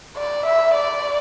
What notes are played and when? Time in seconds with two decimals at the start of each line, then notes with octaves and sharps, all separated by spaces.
0.17 D5
0.46 E5
0.74 D5